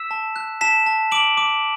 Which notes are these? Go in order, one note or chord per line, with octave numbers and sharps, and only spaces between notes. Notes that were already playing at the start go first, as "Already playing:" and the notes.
Already playing: E6 B6 E7
A5
F#6
A5 B6 E7
A5
D6 D7 F#7
D6